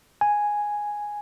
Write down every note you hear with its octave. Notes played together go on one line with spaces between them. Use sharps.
G#5